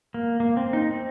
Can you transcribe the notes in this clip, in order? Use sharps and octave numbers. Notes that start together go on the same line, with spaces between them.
A#3
A#3
C4
D#4
C4